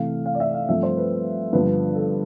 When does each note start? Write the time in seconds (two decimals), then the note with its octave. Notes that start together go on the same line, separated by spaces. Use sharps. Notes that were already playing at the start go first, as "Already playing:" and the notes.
Already playing: C3 E3 A3 F5
0.26 F5
0.35 D5
0.40 E5
0.54 F5
0.68 G2 F3 A3 C4 E5
0.83 C5
0.97 B4
1.53 G2 D3 F3 B3 B4
1.95 A4